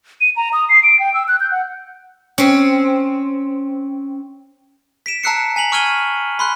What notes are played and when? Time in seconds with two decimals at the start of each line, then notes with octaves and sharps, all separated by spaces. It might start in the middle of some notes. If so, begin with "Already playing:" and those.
0.21 D#7
0.36 A#5
0.53 D#6
0.69 C7
0.83 D7
1.00 G5
1.14 E6
1.28 F#6
1.40 G6
1.52 F#5
2.38 C4 C#4
5.06 B6 D7 E7
5.23 A5 A#5 E6 F#6 C7 C#7
5.56 G#5 B6 F7 F#7
5.72 C#6 E6 F6 G#6 D#7 G7
6.39 B5 C6 F#6